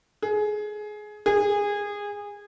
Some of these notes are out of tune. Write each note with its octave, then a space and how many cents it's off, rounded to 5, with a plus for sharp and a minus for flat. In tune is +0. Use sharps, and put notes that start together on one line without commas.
G#4 +20
G#4 -20